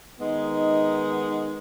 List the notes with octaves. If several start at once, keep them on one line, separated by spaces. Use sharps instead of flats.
D#3 G#3 B3 D#4